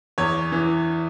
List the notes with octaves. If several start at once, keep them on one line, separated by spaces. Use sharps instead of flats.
E2 C#5
E3